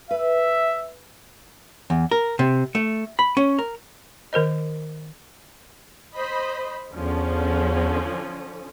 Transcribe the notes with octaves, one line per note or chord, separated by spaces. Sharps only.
B4 E5
E2
A#4
C3
A3
B5
C#4
A#4
D#3 A#4 C5 D#5
C5 D#5 B5
E2 D3 F3 C#4